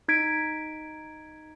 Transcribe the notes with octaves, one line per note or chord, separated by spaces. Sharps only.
D#4 G#6 B6 D7